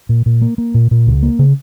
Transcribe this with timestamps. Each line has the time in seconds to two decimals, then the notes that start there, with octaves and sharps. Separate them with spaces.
0.09 A#2
0.26 A#2
0.42 A#3
0.58 A#3
0.74 A#2
0.91 A#2
1.07 C#2
1.23 A#3
1.39 C#3